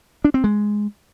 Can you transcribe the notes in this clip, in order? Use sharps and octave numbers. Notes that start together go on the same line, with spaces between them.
D4
C4
G#3